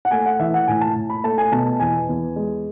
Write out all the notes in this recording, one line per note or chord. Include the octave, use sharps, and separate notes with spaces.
F#5
A3 G#5
F#5
E3 E5
F#5
A2 G#5
A5
A2
B5
A3 A5
G#5
B2 A5
A5
E2 G#5
E2
G#3